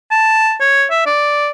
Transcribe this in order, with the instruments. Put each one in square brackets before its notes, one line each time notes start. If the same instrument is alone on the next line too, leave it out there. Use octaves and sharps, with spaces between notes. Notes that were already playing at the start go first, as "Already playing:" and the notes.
[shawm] A5
C#5
E5
D5